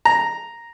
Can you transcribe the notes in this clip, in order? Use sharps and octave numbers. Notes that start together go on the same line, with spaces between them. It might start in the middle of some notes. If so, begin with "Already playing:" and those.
A#5